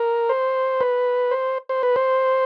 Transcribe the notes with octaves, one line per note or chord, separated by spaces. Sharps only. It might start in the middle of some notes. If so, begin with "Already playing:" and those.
Already playing: A#4
C5
B4
C5
C5
B4
C5